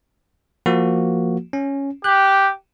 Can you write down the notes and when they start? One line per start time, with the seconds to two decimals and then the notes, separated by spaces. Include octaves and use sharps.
0.66 F3 A#3 F#4
1.53 C#4
2.04 G4 F#6